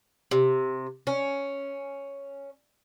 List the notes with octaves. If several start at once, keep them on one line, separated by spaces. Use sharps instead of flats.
C3
C#4